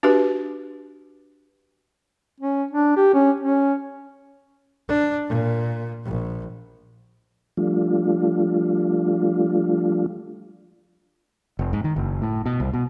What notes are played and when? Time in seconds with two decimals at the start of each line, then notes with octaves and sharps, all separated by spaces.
0.03 D4 F#4 G4 B4
2.40 C#4
2.71 D4
2.96 G4
3.14 C#4
3.41 C#4
4.88 D4
5.28 A#2
6.05 A#1
7.57 F3 G3 A3 D4 F4
11.59 F1
11.73 G#2
11.84 D#3
11.96 F#1
12.22 A2
12.46 B2
12.60 C2
12.74 B2